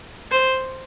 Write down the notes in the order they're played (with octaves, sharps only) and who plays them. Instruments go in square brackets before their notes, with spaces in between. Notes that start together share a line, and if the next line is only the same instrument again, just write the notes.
[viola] C5